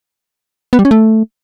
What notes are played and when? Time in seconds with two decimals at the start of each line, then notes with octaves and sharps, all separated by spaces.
0.73 B3
0.79 G3
0.85 C#4
0.91 A3